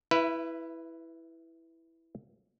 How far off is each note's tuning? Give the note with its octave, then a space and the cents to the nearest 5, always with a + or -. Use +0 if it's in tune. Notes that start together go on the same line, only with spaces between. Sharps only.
E4 -5 B4 +0 E5 +30